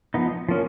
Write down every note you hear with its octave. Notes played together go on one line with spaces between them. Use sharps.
F3 B3 D#4
F3 A#3 C#4